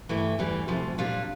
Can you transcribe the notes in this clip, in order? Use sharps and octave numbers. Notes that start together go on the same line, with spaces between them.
G2 E3 A3 E4
E2 E3 G3
D2 C3 F3
A#2 G3 D4 F4